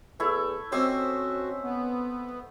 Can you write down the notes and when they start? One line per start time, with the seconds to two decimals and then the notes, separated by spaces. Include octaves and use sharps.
0.20 E2 A3 E4 C#6
0.72 C4 C#4 F#4 G4 C5 D#5 E5
1.62 B3